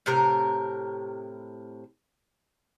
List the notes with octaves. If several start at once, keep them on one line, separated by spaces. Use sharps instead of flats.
A2 C3 A#4